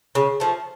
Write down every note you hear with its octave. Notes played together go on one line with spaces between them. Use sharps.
C#3
F3 A3